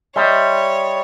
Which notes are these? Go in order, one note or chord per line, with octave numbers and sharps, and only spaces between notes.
G3 C#5 D#5 E5 C6